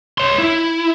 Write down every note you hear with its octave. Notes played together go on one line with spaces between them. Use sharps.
C#5 C6
E4